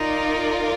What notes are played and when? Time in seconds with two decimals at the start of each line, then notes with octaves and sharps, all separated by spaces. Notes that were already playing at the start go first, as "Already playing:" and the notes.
Already playing: D#4 F4 A#4 D5